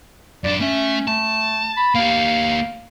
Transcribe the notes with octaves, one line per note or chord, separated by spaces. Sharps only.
F#2 D4 D5
A3 C#4 E5
A3 A5
B5
A#3 G4 F5